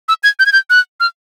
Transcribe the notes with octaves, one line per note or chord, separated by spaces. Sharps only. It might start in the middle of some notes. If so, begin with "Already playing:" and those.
E6
G#6
G6
G#6
G6
F#6
F6